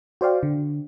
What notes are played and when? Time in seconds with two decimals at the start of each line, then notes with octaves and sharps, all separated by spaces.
0.21 F#4 C5 D5 F5 G5
0.43 D3